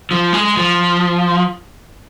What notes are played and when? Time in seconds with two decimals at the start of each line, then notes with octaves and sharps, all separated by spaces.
0.11 F3
0.33 G#3
0.57 F3